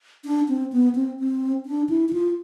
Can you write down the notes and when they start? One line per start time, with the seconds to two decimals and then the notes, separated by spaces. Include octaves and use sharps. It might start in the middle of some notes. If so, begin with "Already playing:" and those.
0.25 D4
0.48 C4
0.72 B3
0.95 C4
1.19 C4
1.66 D4
1.89 E4
2.09 E4
2.13 F4